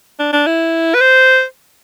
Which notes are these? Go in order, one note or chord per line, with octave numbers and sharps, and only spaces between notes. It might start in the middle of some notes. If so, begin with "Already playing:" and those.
D4
D4
E4
B4
C5